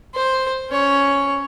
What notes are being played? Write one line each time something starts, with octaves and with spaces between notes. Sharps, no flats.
C5
C#4 C#5